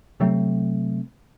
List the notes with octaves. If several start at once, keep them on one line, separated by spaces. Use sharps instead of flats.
C3 F#3 A3 C4